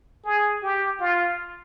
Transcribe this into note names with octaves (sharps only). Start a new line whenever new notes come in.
G#4
G4
F4